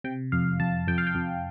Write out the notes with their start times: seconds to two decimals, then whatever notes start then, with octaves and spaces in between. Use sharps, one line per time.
0.04 C3 G5
0.32 F2 F5
0.60 F2 A5
0.88 F2 G5
0.98 F5
1.07 G5
1.15 F2